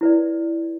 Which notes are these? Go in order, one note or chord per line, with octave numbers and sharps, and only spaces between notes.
E4 B4 D5